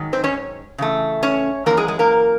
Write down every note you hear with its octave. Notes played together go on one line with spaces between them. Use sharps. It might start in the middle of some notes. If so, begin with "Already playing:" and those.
Already playing: G#2 D#3 F#3
C4 C5
C#4 C#5
C#3 E3 A3
C#4 C#5
F#2 C#3 E3 A#3 A#4
G#3 G#4
G#3 G#4
A#3 A#4